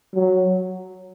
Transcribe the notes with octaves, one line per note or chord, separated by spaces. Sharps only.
F#3